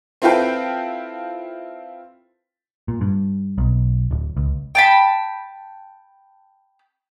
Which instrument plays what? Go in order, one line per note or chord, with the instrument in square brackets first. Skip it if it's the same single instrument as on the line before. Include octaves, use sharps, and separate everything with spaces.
[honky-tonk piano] C4 E4 F4 A4 B4 G5
[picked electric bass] A#2
G2
B1
D1
C#2
[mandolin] G5 A5 B5